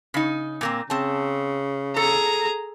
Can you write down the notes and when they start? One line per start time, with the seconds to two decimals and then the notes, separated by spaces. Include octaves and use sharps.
0.14 C#3 D#4
0.61 A#2 A#3 C4
0.90 C#3 C4 A5
1.96 G#4 A4 A#5